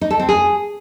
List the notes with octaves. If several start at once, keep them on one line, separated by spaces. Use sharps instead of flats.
D#4
A4
C4
G#4